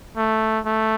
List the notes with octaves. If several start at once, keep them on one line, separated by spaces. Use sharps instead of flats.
A3
A3